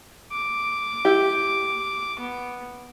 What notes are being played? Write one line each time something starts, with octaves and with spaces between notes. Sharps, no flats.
D6
E4 G4
B3